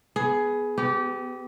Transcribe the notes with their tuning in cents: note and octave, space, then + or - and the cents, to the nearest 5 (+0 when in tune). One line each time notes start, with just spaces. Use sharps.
B3 +0 G#4 +15
B3 +30 G4 -20